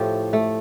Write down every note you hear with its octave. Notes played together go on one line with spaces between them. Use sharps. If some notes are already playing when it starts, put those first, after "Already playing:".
Already playing: A2 F3 A3 G4
A3